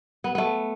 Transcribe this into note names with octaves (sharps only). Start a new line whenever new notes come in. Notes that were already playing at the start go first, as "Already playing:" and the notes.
B3
A3 B3